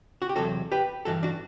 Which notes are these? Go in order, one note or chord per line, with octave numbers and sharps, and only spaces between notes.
F#4
G4
E2 C3 F#3 F#4 A4
G4 B4
G2 E3 F#4 A4
D4 F#4